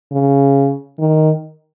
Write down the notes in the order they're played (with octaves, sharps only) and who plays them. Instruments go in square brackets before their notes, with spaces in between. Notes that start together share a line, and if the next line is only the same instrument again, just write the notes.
[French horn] C#3
D#3